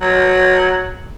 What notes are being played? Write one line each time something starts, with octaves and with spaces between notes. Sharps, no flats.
F#3